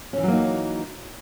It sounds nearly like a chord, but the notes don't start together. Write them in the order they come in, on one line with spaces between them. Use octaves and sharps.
C#4 E3 F#3 A#3 D#4